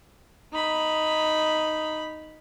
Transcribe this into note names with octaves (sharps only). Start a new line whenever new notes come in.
D#4 B5